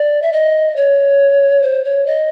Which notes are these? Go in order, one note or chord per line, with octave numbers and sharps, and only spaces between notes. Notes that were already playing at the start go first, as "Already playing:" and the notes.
Already playing: D5
E5
D#5
C#5
C5
C#5
D#5